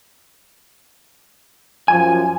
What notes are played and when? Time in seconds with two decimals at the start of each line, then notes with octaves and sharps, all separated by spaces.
1.88 F#2 F3 G#5